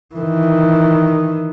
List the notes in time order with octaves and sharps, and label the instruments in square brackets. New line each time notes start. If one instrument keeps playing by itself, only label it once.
[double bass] D#3 E3